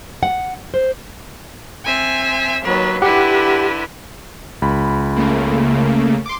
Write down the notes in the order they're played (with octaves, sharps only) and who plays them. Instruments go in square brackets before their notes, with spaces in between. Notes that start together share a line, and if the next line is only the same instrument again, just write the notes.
[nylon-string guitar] F#5
C5
[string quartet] C4 E5 G#5
D#2 F#3 B4
[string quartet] D3 E4 B4 [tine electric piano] G4 F#5
[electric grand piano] C#2 B5
[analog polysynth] C#3 A3 A#3
C6 D6